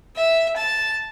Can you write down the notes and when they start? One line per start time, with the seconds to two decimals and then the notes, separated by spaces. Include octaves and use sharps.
0.16 E5
0.56 A5